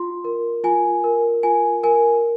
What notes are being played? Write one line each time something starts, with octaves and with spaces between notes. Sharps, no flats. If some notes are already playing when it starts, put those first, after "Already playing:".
Already playing: F4 C6
A#4
F4 G#5
A#4
F4 G#5
A#4 G#5